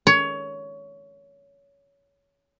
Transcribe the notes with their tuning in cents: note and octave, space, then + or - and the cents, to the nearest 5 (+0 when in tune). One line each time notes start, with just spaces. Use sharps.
C#5 +20